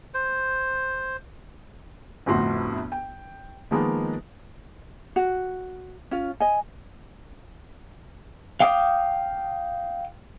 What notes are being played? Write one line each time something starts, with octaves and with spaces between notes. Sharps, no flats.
C5
G1 F2 A2 F#4 C6
G5
D#3 F3 G#3 A#3 B3
F#4
C#4 F4
D#5 G#5
F5 G5 D6 D#6